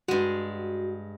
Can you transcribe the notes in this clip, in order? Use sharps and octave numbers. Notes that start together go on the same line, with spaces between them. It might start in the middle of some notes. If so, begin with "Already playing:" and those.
G2 G#3 F#4